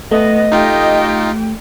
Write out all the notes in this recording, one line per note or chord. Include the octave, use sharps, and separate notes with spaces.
A3 B3 D#5
D#4 F4 G4 G5